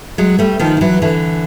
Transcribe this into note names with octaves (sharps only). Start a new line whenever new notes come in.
F#3 G#3
G3 A3
D#3 F3
F3
E3 F#3
D3 E3